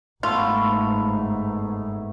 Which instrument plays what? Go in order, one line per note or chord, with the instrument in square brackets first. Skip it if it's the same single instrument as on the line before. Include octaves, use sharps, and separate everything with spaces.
[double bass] G1 G#2 [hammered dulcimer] A3 B3 [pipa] F4